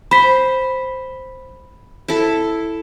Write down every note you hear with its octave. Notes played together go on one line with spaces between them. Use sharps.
C5 B5 B6
E4 A4